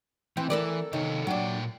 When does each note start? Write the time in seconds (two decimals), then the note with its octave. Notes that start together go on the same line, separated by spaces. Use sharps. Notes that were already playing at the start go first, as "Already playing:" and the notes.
0.37 E3 C4
0.50 E3 A4 A#4 D5
0.93 C3 D#3 A4 C#5
1.27 A#2 F#3 D4 G5